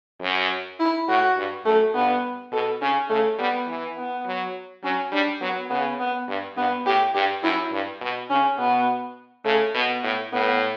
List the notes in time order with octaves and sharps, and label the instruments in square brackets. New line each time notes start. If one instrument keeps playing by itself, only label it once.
[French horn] F#2
[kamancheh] E4
[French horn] A2 [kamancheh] F#4
[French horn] G2
[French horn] F#2 [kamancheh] A3
[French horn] G2 [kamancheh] B3
[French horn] B2 [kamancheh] A4
[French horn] C#3 [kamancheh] C#4
[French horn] C#3 [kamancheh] A3
[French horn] G3 [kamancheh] B3
[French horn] E3
[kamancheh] B3
[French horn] F#3
[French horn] F#3 [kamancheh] C#4
[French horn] G3 [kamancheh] D4
[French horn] F#3 [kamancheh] B3
[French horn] C#3 [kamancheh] B3
[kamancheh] B3
[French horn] G2
[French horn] G2 [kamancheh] B3
[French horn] A2 [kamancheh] G4
[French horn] G2 [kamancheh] G4
[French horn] F#2 [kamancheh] E4
[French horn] G2
B2
[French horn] C#3 [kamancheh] C#4
[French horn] B2 [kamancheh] B3
[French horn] C#3 [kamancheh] A3
[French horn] B2 [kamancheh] B3
[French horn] A2
[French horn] A2 [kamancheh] B3